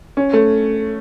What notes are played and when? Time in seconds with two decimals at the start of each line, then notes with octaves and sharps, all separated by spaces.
0.17 C#4
0.33 A3